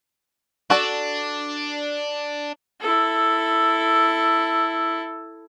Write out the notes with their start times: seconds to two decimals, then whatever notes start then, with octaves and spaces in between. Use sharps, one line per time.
0.70 D4 F#4 A4 D5
2.81 E4 A4